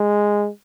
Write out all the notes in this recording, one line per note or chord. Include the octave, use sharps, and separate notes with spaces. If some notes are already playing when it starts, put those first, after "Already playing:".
Already playing: G#3